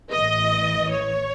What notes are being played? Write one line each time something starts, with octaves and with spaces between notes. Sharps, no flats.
A1 A2 E3 D#5
C#5